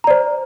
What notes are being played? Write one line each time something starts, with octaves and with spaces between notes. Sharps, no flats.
C5 D5 A#5